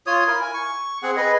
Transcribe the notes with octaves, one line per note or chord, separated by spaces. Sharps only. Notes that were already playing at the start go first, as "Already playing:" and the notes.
F4 C#5 D#6
E4 A#4
G#5
C#6
C4 G#4 F#5
G#4 B4 D#5